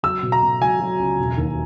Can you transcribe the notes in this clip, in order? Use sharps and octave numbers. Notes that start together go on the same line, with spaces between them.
F#3 E6
B2
A#5
B2
F#3 G#5
F#3
C#2
E1
D#2